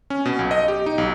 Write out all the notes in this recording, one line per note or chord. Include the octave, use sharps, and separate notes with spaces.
C#4
B2
B1
D#5
G4
D#4
B1